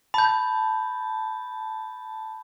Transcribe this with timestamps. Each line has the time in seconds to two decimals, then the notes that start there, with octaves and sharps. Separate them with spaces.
0.14 A5 B5 G6